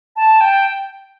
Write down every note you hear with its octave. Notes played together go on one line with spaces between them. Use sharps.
A5
G5